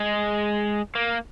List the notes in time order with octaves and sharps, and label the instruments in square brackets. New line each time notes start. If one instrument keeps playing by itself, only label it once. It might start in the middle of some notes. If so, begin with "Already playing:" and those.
Already playing: [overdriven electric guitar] G#3
A#3